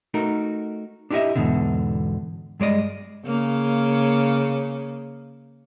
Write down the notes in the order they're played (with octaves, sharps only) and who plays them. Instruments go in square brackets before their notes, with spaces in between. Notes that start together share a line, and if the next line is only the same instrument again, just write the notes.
[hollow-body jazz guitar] A3 D#4 F#4 A#4
D4 E4 G4 C#5 D#5 E5
E2 G#2 B2 D3
G2 G#3 D5 D#5
[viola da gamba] C#3 A#3